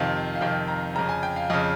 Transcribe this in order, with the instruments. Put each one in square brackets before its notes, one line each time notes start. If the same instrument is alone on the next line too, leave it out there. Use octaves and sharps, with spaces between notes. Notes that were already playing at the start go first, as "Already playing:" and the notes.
Already playing: [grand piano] F2 C3 D#3 F5
F5
F2 C3 D#3 G5
A#5
F2 C#3 A#5
G#5
G5
F5
F2 C#3 D#5